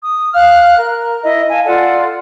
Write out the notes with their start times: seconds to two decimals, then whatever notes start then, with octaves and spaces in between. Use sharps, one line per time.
0.02 D#6
0.34 F5 F6 F#6
0.77 A#4
1.24 E4 D#5
1.51 F5 G#5 A5
1.65 F4 A4 D5 F#5